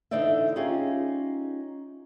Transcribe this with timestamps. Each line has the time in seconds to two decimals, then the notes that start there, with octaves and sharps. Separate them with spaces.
0.11 D3 E3 D#4 C5 D5 E5
0.56 C#4 D#4 F4 G4 G#4